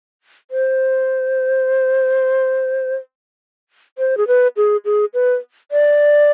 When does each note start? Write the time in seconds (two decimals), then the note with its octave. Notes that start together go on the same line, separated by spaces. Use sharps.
0.51 C5
3.98 C5
4.17 G#4
4.27 B4
4.57 G#4
4.85 G#4
5.14 B4
5.72 D5